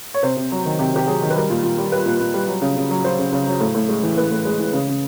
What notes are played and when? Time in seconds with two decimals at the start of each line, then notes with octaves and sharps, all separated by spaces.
0.14 C#5
0.23 C3 C5
0.37 C3
0.52 F#3
0.65 D#3
0.79 C3 G4
0.94 C3 G4
1.07 F#3 G#4
1.22 D#3
1.30 B4
1.36 G3 A#4
1.50 A#2
1.63 A#2
1.78 G3
1.92 G3 B4
2.06 A#2
2.20 A#2
2.34 G3
2.48 F#3
2.62 C#3
2.76 C#3
2.91 F#3
3.04 F#3 C5
3.19 C#3
3.32 C#3
3.47 F#3
3.60 A2
3.75 A2
3.89 G#3
4.03 E3
4.17 A2 B4
4.31 A2
4.45 G#3
4.59 E3
4.73 C#3
4.88 C#3